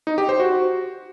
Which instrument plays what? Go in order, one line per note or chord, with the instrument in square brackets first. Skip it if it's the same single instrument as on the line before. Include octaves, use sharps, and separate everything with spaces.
[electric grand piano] D#4
G4
C5
F#4